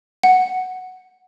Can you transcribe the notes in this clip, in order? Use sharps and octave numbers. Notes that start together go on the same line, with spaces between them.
F#5